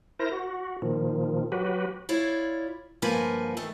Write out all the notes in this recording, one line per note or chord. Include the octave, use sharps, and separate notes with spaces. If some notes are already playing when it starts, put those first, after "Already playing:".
E4 A#4 C5 A#6
F#4
A#2 D#3 F3
F#3 F#4 G4 B4
E4 F4 C#5 D5
D2 G2 F3 A#3 B4 G#5
D#3 A3 A4